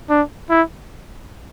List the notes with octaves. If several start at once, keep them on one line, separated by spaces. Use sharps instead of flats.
D4
E4